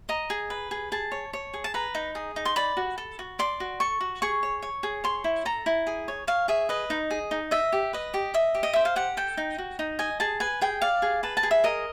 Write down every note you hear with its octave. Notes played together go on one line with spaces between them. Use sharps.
D#5 A#5
G#4
B4
G#4
G#4 A5
C#5
C#5
G#4
A5
B4 A#5
D#4
G#4
D#4
C6
D5 B5
F#4
A4
F#4
D5 C6
F#4
A4 C#6
F#4
G#4 C#6
C#5
C#5
G#4
C#5 C6
E4
A4 A#5
E4
G#4
C#5
C#5 F5
G#4 E5
B4 D#5
D#4
G#4
D#4
D#5 E5
G4
B4 D#5
G4
D#5 E5
G4
D#5
C5 E5
F5
G4 F#5
A4 G5
D#4
F#4
D#4
D#5 G#5
G#4 A5
B4 G#5
G#4 G5
D5 F5
G#4
B4 A5
A5
G#4
E5
A#4 D#5